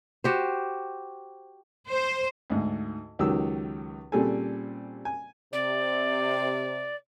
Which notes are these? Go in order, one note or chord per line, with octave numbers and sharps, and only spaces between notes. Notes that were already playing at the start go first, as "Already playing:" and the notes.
F#4 G4 C5
C5
D2 G#2
C#2 D#3 F#3 G4 E6
A#2 C#3 G3 C4 A4 G#5
G#5
C3 D5